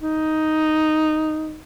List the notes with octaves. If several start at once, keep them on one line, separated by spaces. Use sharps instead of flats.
D#4